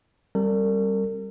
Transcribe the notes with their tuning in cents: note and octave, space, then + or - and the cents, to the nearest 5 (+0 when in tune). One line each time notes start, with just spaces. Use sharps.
G3 +0 C4 +45 A#4 -40